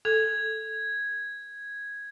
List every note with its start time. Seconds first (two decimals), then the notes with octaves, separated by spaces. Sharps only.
0.05 A4 G#6